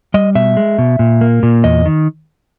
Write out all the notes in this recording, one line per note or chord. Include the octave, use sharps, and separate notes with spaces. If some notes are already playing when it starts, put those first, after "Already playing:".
G3 D#5
B2 E5
G#3
B2
A#2
A#3
A#2
E2 D#5
D#3